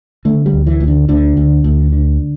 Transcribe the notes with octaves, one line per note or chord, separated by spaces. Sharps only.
D3 A3
G3
D2
E3
D2
D3
D2 D3
D2
D2
D3